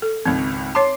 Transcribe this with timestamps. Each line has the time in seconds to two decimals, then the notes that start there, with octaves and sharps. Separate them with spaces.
0.02 A4
0.25 G#1 C#2 C4
0.75 C#5 A5 C6 D6 C7